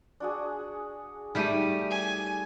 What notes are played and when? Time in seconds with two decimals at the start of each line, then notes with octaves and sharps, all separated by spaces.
0.20 D4 F#4 G#4
1.35 G3 A3 D#4 G4 D#7
1.91 G#5